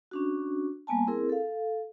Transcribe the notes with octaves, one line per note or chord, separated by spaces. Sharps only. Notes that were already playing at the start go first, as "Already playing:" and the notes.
C#4 D4 F#4
G3 A#3 B3 G#5 A5
C4 E4 G#4 A#4
A4 F5